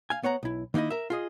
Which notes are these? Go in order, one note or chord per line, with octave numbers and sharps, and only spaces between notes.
F5 G#5
B3 C#5 F#5 A#5
B1 E4
D#3 A#3 D#4 E4 D#5
A#4 E5
F4 G#4 D#5